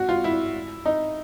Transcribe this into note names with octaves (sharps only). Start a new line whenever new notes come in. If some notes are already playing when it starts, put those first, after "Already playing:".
Already playing: F#4
F4
E4
D#4